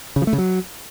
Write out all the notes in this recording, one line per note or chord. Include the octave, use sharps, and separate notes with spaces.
C#3
F3
A3
C#3
F#3